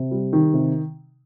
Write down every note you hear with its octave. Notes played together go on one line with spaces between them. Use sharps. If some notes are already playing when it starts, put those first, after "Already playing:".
Already playing: C3
G3
D#3
C3